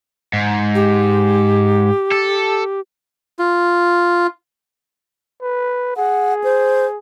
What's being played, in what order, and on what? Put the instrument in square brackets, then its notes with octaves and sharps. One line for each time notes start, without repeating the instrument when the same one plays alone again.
[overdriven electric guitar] G#2
[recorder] G4
[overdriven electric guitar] A4
[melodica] F4
[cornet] B4
[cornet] G#4 [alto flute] F#5
[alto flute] C5